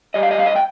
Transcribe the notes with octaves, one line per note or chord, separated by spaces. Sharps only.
G3 D#5
F5
D#5
G2 F5
D#5
G5